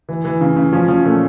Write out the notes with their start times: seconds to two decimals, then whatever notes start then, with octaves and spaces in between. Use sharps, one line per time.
0.09 E3
0.25 E3
0.41 C#3
0.56 C#3
0.73 F3 C#4
0.88 F3 C#4
1.04 A#2 A3